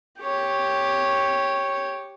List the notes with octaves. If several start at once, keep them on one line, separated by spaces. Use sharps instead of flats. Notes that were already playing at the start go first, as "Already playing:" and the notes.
G4 C#5